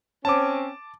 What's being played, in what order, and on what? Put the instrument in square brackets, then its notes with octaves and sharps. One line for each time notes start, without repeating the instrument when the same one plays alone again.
[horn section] C4 C#4 [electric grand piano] A5 D6